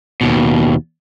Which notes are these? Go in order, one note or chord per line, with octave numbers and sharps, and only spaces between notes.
D#2 B2